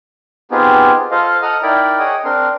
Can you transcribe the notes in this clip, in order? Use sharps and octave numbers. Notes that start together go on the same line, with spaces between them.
B3 C4 D#4 F4 G4 G#4
F4 A4 C5 D#5 F5
A4 D#5 F#5 A#5 D#6 F6
D#4 E4 A#4 D5 G5 B5
G#4 C#5 D#5 F#5 G5 D#6
C4 D4 A#4 C6